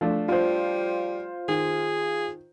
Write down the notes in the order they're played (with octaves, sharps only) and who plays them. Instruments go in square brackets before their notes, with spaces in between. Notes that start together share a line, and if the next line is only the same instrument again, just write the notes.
[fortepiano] F3 A3 D4
[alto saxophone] G3 [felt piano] F4 C5
[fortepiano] D#3 [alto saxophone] G#4